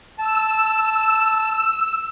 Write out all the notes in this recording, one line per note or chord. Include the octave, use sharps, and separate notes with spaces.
A5 E6